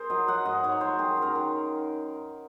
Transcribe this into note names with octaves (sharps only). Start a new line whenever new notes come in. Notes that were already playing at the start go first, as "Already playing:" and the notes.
Already playing: G#4 A#4 C5
F#3 D#5
F#3 F#5
G#2 D#5
G#2 C#5
F#3 C5
D#3 G#4
F#2 A#4
D#3